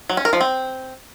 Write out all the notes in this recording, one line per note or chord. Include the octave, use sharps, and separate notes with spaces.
F#3
C#4
A#4
F3
C4